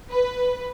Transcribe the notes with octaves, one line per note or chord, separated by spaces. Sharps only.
B4